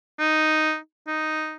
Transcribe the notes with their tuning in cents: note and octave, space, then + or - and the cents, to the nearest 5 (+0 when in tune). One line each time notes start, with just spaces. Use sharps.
D#4 +0
D#4 +0